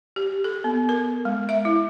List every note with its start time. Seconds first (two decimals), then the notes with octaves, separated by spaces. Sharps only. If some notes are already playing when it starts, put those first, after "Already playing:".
0.16 G4
0.44 A4
0.64 B3
0.89 A#4
1.25 G#3
1.49 E5
1.65 E4